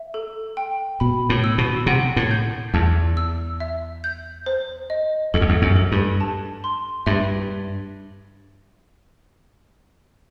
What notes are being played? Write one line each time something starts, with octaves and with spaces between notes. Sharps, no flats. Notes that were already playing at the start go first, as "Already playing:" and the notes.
Already playing: E5
A4
G5
B2 B5
A2
E6
B2
C3 F#5
A2
G6
E2 A5
E6
E5
G6
C5
D#5
E2 A4
F#2
E2
F#2
A4
G2
A5
C6
G2 E5